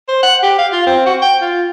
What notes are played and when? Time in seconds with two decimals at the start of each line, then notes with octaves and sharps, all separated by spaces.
0.08 C5
0.23 F#5
0.43 G4
0.59 F5
0.72 F4
0.86 C4
1.06 F#4
1.22 G5
1.42 F4